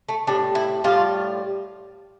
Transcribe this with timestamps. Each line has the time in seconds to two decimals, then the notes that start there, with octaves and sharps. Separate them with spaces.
0.09 A3
0.27 A2 G3 D4
0.55 E4
0.84 A2 G3 F4